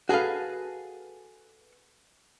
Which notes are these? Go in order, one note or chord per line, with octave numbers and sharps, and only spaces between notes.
F#4 G#4 A4 B4 F5